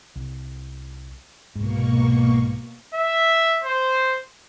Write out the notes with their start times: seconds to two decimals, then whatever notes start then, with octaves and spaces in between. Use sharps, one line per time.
0.16 C2
1.55 C2 G#2 B2 A#3 C#6
2.95 E5
3.64 C5